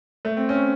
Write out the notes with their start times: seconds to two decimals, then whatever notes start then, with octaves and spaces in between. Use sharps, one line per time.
0.25 A3
0.37 C4
0.49 C#4